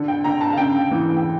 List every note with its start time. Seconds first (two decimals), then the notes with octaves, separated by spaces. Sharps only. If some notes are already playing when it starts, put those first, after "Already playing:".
Already playing: D3
0.08 G5
0.24 D3 A#5
0.41 A5
0.53 F5
0.58 C#3 G5
0.91 E3
1.17 G5